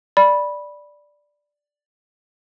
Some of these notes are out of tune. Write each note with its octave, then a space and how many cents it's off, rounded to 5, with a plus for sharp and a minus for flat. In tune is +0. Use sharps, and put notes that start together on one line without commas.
D5 +0 B5 -10